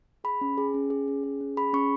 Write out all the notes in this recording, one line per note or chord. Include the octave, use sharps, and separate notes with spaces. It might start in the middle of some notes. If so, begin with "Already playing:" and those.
G#4 B5
C#4
G#4
C#4
G#4
C#4
G#4
C#4
G#4 B5
C#4 C#6